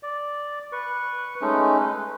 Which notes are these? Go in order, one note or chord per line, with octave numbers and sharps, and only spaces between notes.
D5
B4 C#6
G#3 A3 C#4 D#4
B4